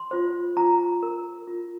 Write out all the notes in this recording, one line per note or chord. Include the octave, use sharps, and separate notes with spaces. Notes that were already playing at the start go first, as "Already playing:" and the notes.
Already playing: C6
F4 C5
F4 A#5
A#4
F4